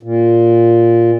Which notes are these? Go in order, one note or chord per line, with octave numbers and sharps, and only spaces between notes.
A#2